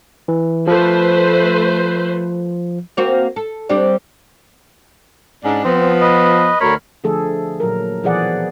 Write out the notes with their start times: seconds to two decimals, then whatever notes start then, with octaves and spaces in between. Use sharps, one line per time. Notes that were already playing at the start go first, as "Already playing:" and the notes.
0.28 E3
0.67 F3 A3 B4 C5
2.97 A#3 C4 F#4
3.36 A4
3.69 G3 C4 D4
5.43 G#2 C#4 D4
5.64 F3 B3 C4
6.01 B4 D#5
6.60 D2 D3 A#4 C#5 B5
7.04 D3 F3 A3 G#4 A4
7.60 A#2 F#3 A#4
8.03 B2 E3 F3 G#4 D5 F#5